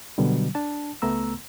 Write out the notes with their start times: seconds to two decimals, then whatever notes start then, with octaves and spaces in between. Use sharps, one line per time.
0.18 B2 D3 F#3 G3
0.55 D4 A5
1.02 C#2 A3 B3 A#5 E6